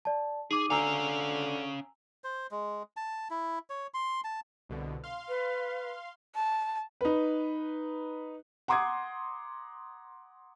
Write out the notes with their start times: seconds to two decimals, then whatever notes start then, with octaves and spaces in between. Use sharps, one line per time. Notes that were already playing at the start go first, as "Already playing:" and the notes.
0.05 D5 A5
0.51 D#4 G#4 D6 D#7
0.70 D3 C#4 F5 G#5 A#5 E6
2.24 C5
2.51 G#3
2.97 A5
3.30 E4
3.70 C#5
3.94 C6
4.24 A5
4.69 C2 B2 D3
5.04 F5 C6
5.29 B4
6.35 A5
7.01 D#4 B4
8.68 F#5 A#5 C6 D6 D#6 G#6